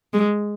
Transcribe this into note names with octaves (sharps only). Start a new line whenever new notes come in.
G#3